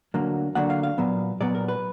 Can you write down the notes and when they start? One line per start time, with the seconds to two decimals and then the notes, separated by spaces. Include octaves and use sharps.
0.14 D2 D3 F#3 A#3
0.55 D2 D3 F#3 A#3 F#5
0.70 F5
0.83 F5
0.98 A#2 F#3 B3
1.41 A#2 F#3 B3 D5
1.55 A#4
1.68 B4